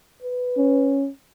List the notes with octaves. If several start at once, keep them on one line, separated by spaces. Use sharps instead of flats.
B4
C#4